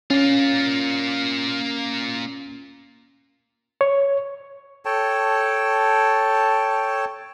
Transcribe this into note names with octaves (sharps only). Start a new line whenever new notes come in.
A#3 C#4 F4
C#5
A4 C#5 G5 A5